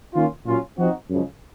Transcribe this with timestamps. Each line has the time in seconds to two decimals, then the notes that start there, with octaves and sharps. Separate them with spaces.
0.14 D#3 A#3 C#4 F4
0.46 A#2 F#3 C#4 F4
0.78 F3 C4 D#4 F#4
1.09 F#2 C#3 F3 G#3